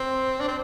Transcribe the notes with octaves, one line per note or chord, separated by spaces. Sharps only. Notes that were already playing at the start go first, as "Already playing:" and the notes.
Already playing: C4
D4
C4